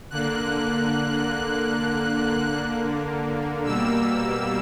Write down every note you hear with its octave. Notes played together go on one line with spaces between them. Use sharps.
D3 A#3 F#6
B2 G3 A#3 E6